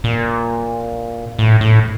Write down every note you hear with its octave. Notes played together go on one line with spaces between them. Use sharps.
A#2
A2
A2